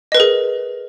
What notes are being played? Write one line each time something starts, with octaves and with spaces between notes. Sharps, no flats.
G#4 A#4 B4 D#5